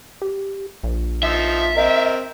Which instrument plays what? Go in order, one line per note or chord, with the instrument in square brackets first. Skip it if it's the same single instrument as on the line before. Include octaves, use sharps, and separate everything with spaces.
[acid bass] G4
A#1
[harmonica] F3 D#4 [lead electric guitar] E5
[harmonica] C4 A#4 [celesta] D#5